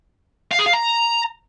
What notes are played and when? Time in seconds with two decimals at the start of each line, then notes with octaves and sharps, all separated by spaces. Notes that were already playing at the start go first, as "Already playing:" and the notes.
0.51 F5
0.59 G#4
0.66 F5
0.73 A#5